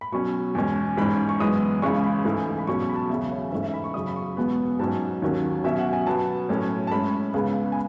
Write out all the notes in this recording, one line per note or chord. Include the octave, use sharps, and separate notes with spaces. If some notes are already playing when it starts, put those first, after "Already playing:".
B5
B2 F#3 C#4 C#6
E2 B2 G#3 C#4
G#2 E3 G#3 C#4 B5
C#6
F#2 E3 G#3 B3 D#6
C#2 C#3 E3 G#3 C#4 C#6
B5
G#2 E3 A3
B5
B2 F#3 C#4 C#6
C#6
B5
A5
E2 C#3 F#3 E5
C#5
G#2 E3 A3 C#4 E5
E5
B5
C#6
F#2 C#3 F#3 D#6
B5
C#6
E2 B2 G#3 B3
G#2 F#3 C#4 A5
D#2 D#3 F#3 C#4
B2 F#3 C#4 E5
F#5
G#5
B2 F#3 B3 A5
A2 F#3 A3 C#4
A5
A2 G#3 C#4 B5
C#2 C#3 G#3 B3
G#5